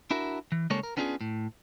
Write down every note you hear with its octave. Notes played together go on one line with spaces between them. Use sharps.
D4 E4 F#4 A#4
E3
C#3 G3 G#3 A#3 A4 C#5
A#4
B3 C#4 D4 F4 F#4 G#4
A2